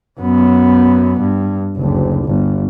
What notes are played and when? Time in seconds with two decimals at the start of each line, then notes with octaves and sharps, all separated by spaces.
0.20 F#2 B3
1.20 G2
1.76 F#1 D2
2.25 G1